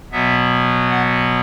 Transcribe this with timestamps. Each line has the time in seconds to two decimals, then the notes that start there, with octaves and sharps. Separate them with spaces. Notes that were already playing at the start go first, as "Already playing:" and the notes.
0.12 B2 F#3 B3 E5
0.90 F#5